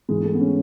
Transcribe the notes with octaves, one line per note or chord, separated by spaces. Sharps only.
G#2 E3 G#3
G#3
A3
B3
C#4